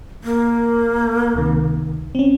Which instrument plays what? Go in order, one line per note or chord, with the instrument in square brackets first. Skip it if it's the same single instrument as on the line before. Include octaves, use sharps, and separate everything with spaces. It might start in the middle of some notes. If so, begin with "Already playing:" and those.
[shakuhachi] A#3
[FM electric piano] C#2 C3 D#3
C4 C#4